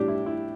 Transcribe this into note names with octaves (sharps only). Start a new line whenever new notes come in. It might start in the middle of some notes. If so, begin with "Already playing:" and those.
Already playing: A2 G3 D4 G4
E4
E4